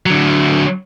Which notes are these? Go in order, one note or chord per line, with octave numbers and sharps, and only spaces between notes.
D3 F#3